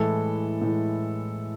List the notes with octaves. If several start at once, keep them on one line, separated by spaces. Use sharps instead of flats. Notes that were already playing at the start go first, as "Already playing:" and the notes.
Already playing: A2 E3 G#3 A4
A2 E3 G#3